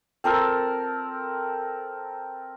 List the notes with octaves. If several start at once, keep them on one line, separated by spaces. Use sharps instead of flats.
C4 A4 A#4